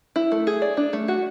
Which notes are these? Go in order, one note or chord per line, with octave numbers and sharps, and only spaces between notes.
E4
A3
G#4
D5
D4
A3
F#4